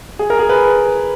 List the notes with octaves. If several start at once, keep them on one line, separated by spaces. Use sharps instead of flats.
G#4
A#4
G#4
B4